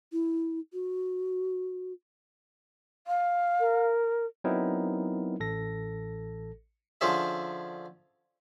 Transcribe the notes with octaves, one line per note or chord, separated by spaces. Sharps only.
E4
F#4
F5
A#4
F#3 B3 C4 D#4 E4 A#4
A1 A4 A#6
D3 F3 C#4 G#4 E5